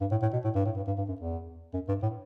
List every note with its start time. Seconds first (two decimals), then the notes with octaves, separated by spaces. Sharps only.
0.01 G2
0.11 A2
0.22 A2
0.33 B2
0.44 A2
0.55 G2
0.65 A2
0.76 G2
0.87 G2
0.98 G2
1.08 F#2
1.20 E2
1.73 F#2
1.88 G2
2.02 A2